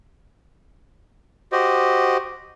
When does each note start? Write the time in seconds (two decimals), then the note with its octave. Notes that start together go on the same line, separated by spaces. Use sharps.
1.52 F#4 G4 C5 D#5